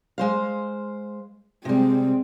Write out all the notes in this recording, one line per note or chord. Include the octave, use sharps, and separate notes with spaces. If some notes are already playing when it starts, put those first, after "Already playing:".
G#3 C5 F5
C3 G3 G#3 C4